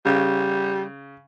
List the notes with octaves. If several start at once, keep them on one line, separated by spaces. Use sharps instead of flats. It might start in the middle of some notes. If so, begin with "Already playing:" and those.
C#3 G3